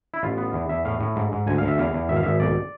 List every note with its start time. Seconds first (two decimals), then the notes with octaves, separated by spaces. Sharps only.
0.14 E4
0.23 A1 F4
0.38 B3
0.53 E2
0.69 E2 E5
0.85 A2 F5
1.00 A2
1.16 G#2
1.32 G#2
1.47 D2 G#5
1.58 D2 F5
1.68 E5
1.78 E2 F5
1.93 E2
2.09 G#1 E5
2.16 F5
2.23 G#1 E5
2.40 B1 D5